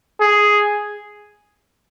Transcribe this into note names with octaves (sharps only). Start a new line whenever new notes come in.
G#4